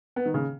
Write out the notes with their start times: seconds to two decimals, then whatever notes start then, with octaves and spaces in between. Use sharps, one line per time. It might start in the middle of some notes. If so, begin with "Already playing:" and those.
0.16 B3
0.26 D#3
0.34 C#3